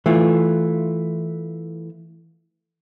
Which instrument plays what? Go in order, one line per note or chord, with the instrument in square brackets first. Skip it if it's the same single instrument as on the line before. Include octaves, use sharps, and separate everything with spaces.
[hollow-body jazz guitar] E3 A3 E4 F4